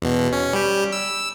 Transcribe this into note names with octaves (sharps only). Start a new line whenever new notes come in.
E2 B2
C#4
G3 G4
E6